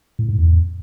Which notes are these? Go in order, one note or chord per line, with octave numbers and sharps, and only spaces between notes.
A2
G#2
E2